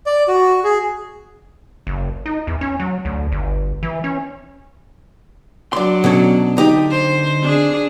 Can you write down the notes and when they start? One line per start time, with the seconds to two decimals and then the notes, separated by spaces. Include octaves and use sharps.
0.06 D5
0.28 F#4
0.64 G#4
1.87 F#1
2.26 D#4
2.47 E2
2.61 C#4
2.80 F#3
3.05 D2
3.32 G1
3.83 E3
4.04 C#4
5.73 F#3 D4 D5 C6
6.04 B2 C#4 A4
6.57 D3 D#4 G4
6.91 C5
7.42 D4 G#4